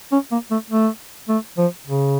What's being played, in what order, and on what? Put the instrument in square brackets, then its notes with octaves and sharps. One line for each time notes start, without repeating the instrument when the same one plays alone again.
[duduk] C#4
A#3
A3
A3
A3
F3
C#3